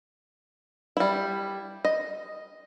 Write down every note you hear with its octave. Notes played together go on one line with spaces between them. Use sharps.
G3 E4
D#5